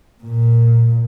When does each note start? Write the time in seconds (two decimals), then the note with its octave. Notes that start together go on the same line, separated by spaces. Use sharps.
0.24 A#2